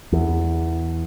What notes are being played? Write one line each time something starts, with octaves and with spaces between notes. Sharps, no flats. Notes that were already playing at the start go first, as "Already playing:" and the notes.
E2